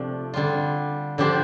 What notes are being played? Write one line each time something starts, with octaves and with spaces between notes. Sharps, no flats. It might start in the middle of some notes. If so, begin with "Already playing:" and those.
Already playing: C3 F3 A3 D4 F4
D3 G3 F4
D3 F3 D4 G4 C5